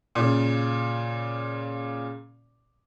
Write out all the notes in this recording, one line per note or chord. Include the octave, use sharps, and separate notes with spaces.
A#2 C#3